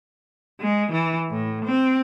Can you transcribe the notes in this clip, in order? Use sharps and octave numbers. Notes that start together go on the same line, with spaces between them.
G#3
E3
A2
C4